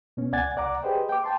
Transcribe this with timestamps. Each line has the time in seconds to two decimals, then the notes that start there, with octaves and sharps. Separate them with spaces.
0.17 B2 B3 C#4
0.32 C#2 D5 F#5 G#5 G#6 A6
0.56 C2 D5 F#5 A#5 D6
0.82 G4 G#4 B4 C5 D#5 G5
1.09 G5 D6
1.24 G5 A5 C6